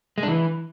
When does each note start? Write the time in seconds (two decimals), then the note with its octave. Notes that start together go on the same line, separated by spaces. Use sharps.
0.18 G#3
0.23 D4
0.28 E3